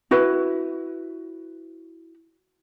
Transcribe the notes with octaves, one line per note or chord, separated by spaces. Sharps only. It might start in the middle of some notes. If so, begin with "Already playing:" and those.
E4 F#4 B4